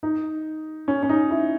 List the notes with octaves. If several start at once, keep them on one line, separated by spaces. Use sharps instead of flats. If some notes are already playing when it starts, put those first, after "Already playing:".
D#4
C#4
C#4
D#4
E4